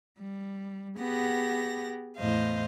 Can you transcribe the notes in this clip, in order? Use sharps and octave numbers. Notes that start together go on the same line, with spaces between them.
G3
B3 G4 G#4 F#5 A#6
E2 A2 C5 D#5 F5